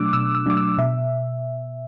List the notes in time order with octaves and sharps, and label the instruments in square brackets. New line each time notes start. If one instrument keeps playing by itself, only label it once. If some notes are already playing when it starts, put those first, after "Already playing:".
Already playing: [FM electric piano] B2 F#3 A3 D4 D6 E6 F#6
B2 E6
E6
F#3 A3 D4 D6
E6
B2 E5